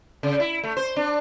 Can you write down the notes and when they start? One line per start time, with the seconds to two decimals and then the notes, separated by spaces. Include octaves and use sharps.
0.23 C#3
0.40 E4
0.64 A3
0.77 C5
0.96 D4